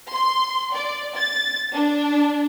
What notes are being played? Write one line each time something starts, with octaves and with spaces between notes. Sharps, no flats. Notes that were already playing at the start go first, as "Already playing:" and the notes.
C6
D5
A6
D4